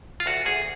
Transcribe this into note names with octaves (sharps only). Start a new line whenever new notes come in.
F4
D2 F#4
D2 G#4